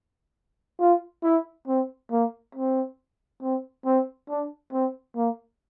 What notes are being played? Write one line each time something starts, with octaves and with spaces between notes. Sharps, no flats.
F4
E4
C4
A#3
C4
C4
C4
D4
C4
A#3